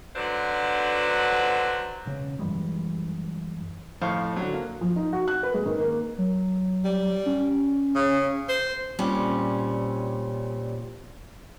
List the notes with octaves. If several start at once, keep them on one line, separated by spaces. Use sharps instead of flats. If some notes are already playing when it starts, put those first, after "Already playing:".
D3 F#3 D4 B4 C5
E1 C#3 C#4
F#2 E3 G3 G#3
F2 A2 C5 F5 A5 C#6
D3 F#3
A#3
F3
D#4
F#4
F#6
B4
G#3
D#3
A#3
F#3
G3
C#4
C#3
C5
A#2 G3 C4 C#4